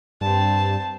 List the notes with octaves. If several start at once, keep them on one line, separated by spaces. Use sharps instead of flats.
G2 C4 A5